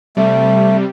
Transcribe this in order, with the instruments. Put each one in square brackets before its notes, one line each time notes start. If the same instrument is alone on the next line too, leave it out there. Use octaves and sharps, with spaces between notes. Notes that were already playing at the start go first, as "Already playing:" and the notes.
[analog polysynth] C3 G3 [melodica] A3